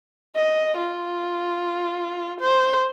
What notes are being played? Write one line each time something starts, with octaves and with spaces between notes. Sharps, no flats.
D#5
F4
C5